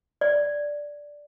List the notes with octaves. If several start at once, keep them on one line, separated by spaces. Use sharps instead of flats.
D5